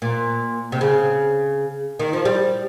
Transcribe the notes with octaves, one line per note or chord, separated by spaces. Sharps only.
A#2
C3
C#3
D#3
F3
G3